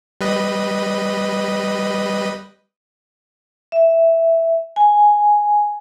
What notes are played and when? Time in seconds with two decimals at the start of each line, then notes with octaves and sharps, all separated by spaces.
0.21 G3 B4 D#5
3.72 E5
4.76 G#5